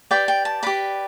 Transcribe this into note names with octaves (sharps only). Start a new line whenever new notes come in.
G4 B4 D5 G5
G5
A5
G4 B4 D5 B5